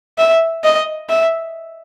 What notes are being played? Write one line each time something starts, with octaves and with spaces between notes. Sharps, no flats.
E5
D#5
E5